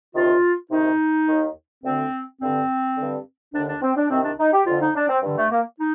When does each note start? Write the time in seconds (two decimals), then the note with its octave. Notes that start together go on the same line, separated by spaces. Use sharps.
0.14 D2 C3 D#3 F4
0.70 D2 C3 D#3 D#4
1.27 D#2 D#3
1.83 D2 D3 C4
2.40 G2 D3 C4
2.96 G2 D3
3.53 D#2 D3 D4
3.67 D4
3.82 C4
3.95 D4
4.10 C2 C3 D#3 C4
4.24 D4
4.39 D#4
4.53 G4
4.66 F2 D3 F4
4.81 D#4
4.95 D4
5.08 C4
5.22 G2 D3
5.37 A3
5.51 A#3
5.79 D#4